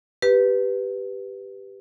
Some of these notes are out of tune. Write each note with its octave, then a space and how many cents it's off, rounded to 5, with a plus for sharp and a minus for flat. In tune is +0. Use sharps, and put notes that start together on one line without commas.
G4 +0 B4 +0